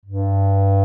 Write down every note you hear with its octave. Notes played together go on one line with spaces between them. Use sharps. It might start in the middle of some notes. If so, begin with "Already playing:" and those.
G2